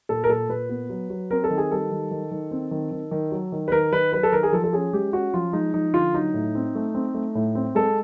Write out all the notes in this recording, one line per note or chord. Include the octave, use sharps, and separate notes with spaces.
A#2 A4
A#4
A#2 A4
A#2 B4
B3
F#3
F#3
C4 A#4
A4
D#3
G#4
G3 A4
D#3
D#3
D#3
C4
D#3
D#3
D#3
F#3
D#3
B4
D#3 A#4
D#3 B4
F#3 B4
A4
D#3 A#4
G#4
F3 A4
A4
C#4 G#4
G#3 G4
C#4 F#4
F3 F4
G#3 D#4
F3 D#4
D3 F4
F#3 D#4
A2
C4
A3
C4
A3
A2
C4
G#3 A4